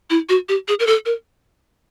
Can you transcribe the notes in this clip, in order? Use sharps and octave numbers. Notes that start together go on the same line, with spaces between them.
E4
F#4
G4
G#4
A#4
A4
A#4